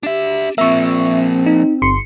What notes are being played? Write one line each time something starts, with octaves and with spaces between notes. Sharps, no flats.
D4 G4 E5
F3 A#3 C4 E5 C#6
D#4
G1 C6 C#7